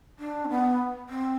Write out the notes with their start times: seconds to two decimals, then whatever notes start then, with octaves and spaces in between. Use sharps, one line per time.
0.19 D4
0.45 C4
0.49 B3
1.09 C4